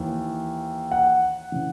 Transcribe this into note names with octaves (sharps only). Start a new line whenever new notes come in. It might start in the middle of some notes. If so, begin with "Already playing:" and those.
Already playing: D#2 E3
F#5
C#3 E3